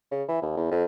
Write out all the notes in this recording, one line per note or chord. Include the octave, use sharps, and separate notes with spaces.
C#3
E3
D#2
E2
F2